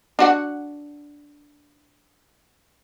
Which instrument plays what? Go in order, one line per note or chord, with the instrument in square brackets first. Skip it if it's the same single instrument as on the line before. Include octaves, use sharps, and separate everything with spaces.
[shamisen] D4 F#4 F#5